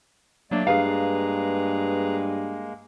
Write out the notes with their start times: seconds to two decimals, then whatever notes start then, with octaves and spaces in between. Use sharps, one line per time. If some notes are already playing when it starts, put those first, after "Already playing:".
0.51 F#3 A3 A#3 D4 D5
0.67 G2 G#3 A#3 G#4 B4 F5 A#5